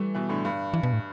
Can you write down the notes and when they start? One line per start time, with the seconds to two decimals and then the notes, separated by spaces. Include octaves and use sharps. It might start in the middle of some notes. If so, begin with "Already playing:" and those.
Already playing: E3 G3 A3
0.14 B2 E3
0.29 A2 D3
0.45 G2
0.74 E3
0.83 B2
0.93 A2